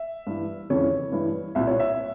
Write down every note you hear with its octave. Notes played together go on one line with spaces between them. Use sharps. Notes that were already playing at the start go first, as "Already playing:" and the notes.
Already playing: E5
G2 E3
F2 C#3 E3 C#5
G2 E3
C2 A#2 E5
C#5
E5